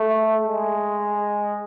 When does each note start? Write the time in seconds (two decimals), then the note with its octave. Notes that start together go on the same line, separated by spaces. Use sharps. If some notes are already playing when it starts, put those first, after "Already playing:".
Already playing: A3
0.46 G#3